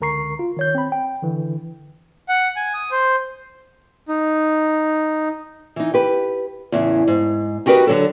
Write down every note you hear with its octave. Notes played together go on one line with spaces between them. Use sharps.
C#2 D3 A#4 A#5 C#6 C7
F4
D#3 C#5 G6
C4 B5
G5
D3 E3
F#5
G#5
D#6
C5
D#4
E3 D#4
G4 B4
E2 A2 C#3
G#2
D#4 F#4 G4 A#4 B4 D#5
D3 F#3 A4